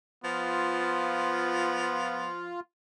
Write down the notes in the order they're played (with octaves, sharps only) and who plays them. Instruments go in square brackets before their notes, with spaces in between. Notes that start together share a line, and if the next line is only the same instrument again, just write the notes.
[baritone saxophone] F3 [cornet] B3 [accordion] F4